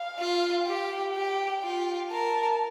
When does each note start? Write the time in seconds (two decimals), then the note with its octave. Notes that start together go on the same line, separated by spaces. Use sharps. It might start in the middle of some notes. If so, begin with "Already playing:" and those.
Already playing: F5
0.19 F4
0.67 G4 G5
1.15 G4
1.63 F4
2.11 A#4 A5